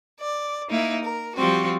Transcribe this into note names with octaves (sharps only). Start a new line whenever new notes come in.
D5
A#3 D#4 E4
A#4
F3 G3 C4 F#4